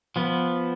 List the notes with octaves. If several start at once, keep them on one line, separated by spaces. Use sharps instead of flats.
F3 B3